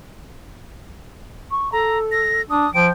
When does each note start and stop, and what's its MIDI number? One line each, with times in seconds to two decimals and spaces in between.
1.51 1.72 85
1.72 2.41 69
1.72 1.98 82
2.12 2.42 94
2.50 2.66 62
2.50 2.74 87
2.74 2.89 53
2.74 2.92 79
2.74 2.86 98